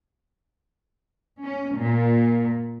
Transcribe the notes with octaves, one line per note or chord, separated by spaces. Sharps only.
C#4
A#2